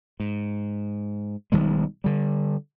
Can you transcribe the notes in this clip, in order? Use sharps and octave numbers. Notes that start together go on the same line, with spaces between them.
G#2
B1 D#3 G3 G#3
D3 G3